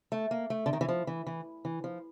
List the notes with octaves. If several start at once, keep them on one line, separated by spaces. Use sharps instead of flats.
A3
A#3
A3
D3
D#3
E3
F3
E3
E3
E3
F3